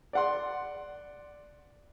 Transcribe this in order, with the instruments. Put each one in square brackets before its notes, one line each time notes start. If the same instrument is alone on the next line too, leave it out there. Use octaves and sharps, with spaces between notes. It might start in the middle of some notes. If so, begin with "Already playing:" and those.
[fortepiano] D5 F#5 C6